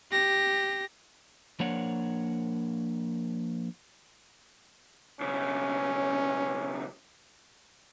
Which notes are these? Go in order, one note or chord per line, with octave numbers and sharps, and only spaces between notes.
G4 A#6
F3 A#3 D4 A#4 C#5 F#5
B1 C#3 C#4